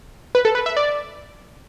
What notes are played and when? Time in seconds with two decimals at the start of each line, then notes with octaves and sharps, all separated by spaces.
0.35 B4
0.45 A4
0.55 B4
0.66 E5
0.77 D5